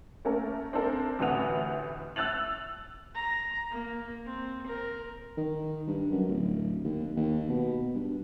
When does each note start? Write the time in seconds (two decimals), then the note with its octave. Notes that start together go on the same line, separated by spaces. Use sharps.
0.25 A3 A#3 C#4 A4 A#4
0.73 C4 D4 A4 A#4
1.19 A1 D2 A2 B4 F#5 F7
2.16 E6 F#6 A6 F7 F#7
3.15 A#5
3.71 A#3
4.26 C4
4.66 A#4
5.37 D#3
5.87 G2
6.12 F#2
6.29 D1
6.84 D#2
7.17 D#2
7.49 B2
7.95 G2